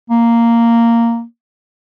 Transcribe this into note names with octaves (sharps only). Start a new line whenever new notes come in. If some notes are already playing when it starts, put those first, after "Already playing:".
A#3